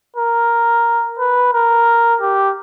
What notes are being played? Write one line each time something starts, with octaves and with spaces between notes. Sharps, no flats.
A#4
B4
A#4
G4